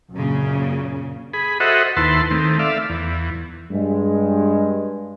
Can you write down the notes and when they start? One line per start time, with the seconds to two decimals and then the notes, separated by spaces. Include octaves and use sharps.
0.13 F#2 A#2 C#3
1.34 G#4 B5
1.60 F#4 A4 C5 D#5 E5 F#5
1.96 D#2 E4 B4 A5 C6
2.31 D#3 A3 C4
2.59 A4 D5 E5 F5
2.90 E2
3.71 G2 G#3